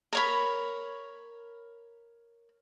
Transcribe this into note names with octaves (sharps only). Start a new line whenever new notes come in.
A#4 C#5 B5